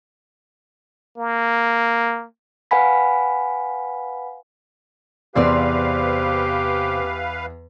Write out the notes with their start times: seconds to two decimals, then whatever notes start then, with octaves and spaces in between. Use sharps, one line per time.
1.18 A#3
2.71 B4 F5 F#5 G#5 B5 B6
5.35 E2 C3 C4 G4 B4 D5 F5